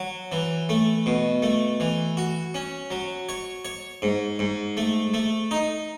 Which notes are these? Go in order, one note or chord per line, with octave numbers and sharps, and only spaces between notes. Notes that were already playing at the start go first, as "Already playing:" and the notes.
Already playing: F#3
E3
A3
B2
A3
E3
F#4
C#4
F#3
C#5
C#5
G#2
G#2
A3
A3
D#4